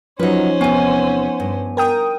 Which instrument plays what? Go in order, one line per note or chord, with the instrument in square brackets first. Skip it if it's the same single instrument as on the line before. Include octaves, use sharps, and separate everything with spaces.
[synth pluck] F3 D#4 [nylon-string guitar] F#3 B4 [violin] C#4 C5
[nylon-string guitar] E2 C3 [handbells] B3 G#5
[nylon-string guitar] G2
[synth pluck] A#4 G5 D#6